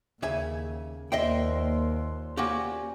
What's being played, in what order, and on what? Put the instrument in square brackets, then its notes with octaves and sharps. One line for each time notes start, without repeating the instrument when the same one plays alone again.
[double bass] D#2 [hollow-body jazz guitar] C#3 E5 G#5
[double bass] D#2 [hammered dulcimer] A#2 C5 C6 [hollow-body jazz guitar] D#5 E5 G5
[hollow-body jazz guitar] A#3 F#4 G4 [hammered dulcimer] C#4